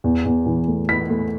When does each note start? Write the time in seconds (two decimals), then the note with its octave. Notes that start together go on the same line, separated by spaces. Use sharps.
0.04 E2
0.25 E2
0.46 E3
0.68 A3
0.89 E3 B6
1.10 A3